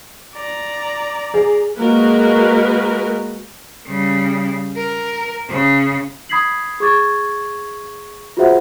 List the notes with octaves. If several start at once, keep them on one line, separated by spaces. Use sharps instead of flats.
D5 A#5
G#4
G#3 A#3 F#4 A#4 B4
C#3 G3
A#4
C#3
B5 D#6 G#6 B6 C7 F#7
G#4 C#6 D6 G#6 A6
F4 F#4 G#4 C5 E5 F#5